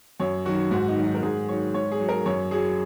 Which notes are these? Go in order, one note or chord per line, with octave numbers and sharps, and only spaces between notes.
F#2 C#5
D#3 F#3 F#4
G#2 F#4
D#4
D#3 F#3
D#4
A#4
G#2 G#4
D#3 F#3 C#5
G#2 C#5
G#4
F#3
A#4
F#2 C#5
F#3 G#4